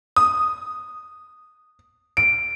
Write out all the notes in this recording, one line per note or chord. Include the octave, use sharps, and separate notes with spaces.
D#6
D7